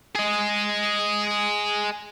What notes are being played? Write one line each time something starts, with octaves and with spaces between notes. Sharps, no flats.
G#4 D#5